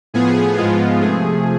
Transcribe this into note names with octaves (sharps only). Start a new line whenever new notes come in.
A2 F3 B3 G#4
G#2 F3 G#3 B3 F4
C3 F3 A3 G#4